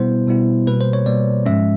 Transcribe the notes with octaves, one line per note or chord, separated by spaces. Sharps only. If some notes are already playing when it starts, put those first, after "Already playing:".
Already playing: B2 G3 B3 E4 C5
B2 G3 B3 E4
B2 G3 A#3 B4
C5
C#5
B2 G3 A#3 D5
G#2 F3 G#3 C#4 E5